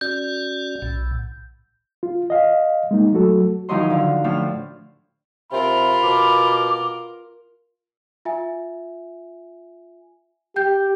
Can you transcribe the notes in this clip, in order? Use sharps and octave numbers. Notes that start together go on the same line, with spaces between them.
C#4 F#4 D5 G6
B1 A2
F4
D#5 F5
G#3 A#3 D#4
F#3 A3 F#4 A4
D#3 F3 F#3 E4 D#5 C6
D3 F5
A2 F3 D4 F4 F6
C3 F4 A#4 B5
B2 D6
F4 E5 G#5
G4 G5 G6